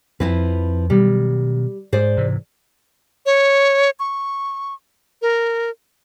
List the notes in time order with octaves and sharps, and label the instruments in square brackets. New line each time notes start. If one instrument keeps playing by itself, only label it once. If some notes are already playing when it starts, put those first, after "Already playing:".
[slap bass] F2 C4 [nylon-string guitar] F3 E4 B4
[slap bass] B2 D#3 F#3 [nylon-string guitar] G3
[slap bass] G#2 [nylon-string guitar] G#4 C5 D5
[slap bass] G#2 C3 E3
[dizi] C#5
C#6
A#4